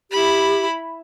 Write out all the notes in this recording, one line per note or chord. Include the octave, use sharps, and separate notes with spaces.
E4 G4 B5